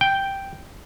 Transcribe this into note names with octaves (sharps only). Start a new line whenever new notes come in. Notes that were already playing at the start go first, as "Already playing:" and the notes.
G5